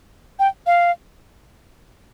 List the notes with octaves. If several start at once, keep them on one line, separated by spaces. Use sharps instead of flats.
G5
F5